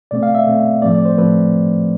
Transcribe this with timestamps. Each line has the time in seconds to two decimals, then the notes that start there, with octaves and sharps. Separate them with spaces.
0.11 B2 A3 C4 D5
0.23 F5
0.35 E5
0.47 B2 A3 C4
0.82 A2 F3 A3 C4 D5
0.95 D5
1.05 C5
1.18 A2 F3 A3 C4 B4